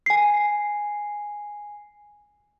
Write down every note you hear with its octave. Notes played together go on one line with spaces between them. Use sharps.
G#5 C7